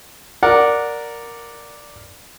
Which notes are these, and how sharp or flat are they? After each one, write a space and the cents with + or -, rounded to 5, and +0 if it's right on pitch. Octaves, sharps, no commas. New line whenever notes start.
A#4 +0 D5 +0 F#5 -15